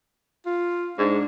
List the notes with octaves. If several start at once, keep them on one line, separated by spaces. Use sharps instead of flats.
F4
G#2 D4